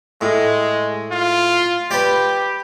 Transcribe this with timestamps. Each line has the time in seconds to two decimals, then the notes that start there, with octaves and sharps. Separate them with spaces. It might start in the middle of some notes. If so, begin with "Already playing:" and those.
0.21 A2 G#3
1.11 F4
1.91 G4 B4 D5